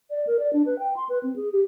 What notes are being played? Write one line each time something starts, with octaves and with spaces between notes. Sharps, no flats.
D5
A#4
D5
D4
B4
G5
C6
B4
C4
G#4
G4